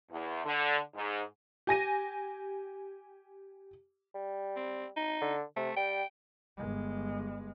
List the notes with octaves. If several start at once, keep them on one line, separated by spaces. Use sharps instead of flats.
E2
D3
G#2
G4 G#5 A#6 D#7
G3
C4
D#4
D3
C3 A3
G3 G5
G1 G#3